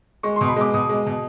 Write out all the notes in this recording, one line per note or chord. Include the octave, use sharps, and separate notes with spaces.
G#3 C#6
B2 C6
B5
G#3 D6
B2 D#6
G#3
B2